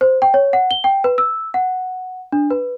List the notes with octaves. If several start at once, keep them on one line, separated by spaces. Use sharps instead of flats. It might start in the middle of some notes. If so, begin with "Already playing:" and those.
C5
G5
C#5
F#5
G7
G5
B4
E6
F#5
D4
B4